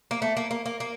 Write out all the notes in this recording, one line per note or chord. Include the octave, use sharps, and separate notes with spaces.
A#3
A3
A#3
A#3
A#3
A#3